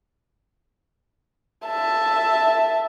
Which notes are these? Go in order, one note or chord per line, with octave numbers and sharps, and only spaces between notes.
E5 A5